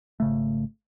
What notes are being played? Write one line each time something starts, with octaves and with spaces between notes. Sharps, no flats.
G#1 C#3 A3